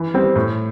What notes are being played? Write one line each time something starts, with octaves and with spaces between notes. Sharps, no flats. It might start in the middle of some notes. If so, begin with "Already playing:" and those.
Already playing: E3
G3 C4
A2